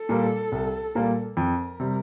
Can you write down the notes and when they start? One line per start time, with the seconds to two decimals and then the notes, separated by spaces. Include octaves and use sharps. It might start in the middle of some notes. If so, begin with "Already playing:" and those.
Already playing: A4
0.09 A#2 G3 A#3
0.52 C2
0.95 A#2 G3 A#3
1.37 F2 A#4
1.80 C3 G3